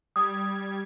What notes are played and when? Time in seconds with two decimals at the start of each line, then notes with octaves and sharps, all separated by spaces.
0.16 G3 D#6 G#6